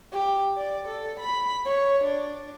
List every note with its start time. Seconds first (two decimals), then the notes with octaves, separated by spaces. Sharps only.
0.12 G4
0.57 D5
0.88 A4
1.20 B5
1.65 C#5
2.04 D4